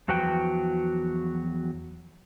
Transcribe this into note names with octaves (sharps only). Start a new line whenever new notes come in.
E2 F3 F#3 F#4 B4 G5